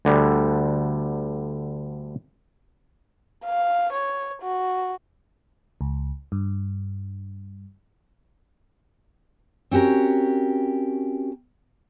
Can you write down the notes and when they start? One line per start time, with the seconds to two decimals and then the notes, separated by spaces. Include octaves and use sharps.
0.05 D2 D3 G3
3.45 F5
3.93 C#5
4.42 F#4
5.81 C#2
6.32 G2
9.71 C4 C#4 F#4 G4 A#4